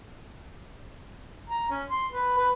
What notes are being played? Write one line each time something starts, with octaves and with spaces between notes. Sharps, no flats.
A#5
C#4
C6
B4
B4